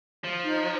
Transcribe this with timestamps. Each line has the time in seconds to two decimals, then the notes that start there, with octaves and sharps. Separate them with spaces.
0.24 F3
0.44 D#4